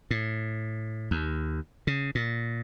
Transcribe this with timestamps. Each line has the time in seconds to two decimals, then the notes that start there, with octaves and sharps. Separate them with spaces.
0.11 A2
1.11 D#2
1.87 C#3
2.15 A#2